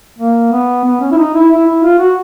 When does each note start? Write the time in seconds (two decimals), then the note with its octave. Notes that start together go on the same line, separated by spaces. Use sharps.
0.19 A#3
0.52 B3
0.84 B3
1.01 C#4
1.12 E4
1.18 D#4
1.34 E4
1.51 E4
1.67 E4
1.83 F4
1.99 F#4